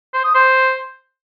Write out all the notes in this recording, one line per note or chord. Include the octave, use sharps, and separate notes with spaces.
C5
D#6
C5